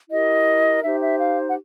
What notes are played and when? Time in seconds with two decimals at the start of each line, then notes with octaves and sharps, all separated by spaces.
0.10 E4 G4 A#4 D#5
0.82 D#4 G4 C5 E5
1.01 E5
1.18 F5
1.48 F#5